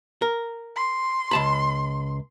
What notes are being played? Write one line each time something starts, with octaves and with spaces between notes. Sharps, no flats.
A#4
C6
C#2 A5 B5